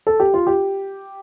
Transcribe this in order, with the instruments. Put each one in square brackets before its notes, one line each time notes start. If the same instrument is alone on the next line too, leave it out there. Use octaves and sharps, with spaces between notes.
[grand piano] A4
G4
F4
G4